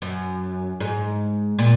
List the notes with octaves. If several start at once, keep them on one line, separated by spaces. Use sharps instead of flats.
F#2
G#2
A#2